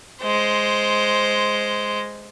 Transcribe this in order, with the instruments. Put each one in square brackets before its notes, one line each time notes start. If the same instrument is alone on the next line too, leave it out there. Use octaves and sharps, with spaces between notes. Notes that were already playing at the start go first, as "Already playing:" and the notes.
[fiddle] G#3 C5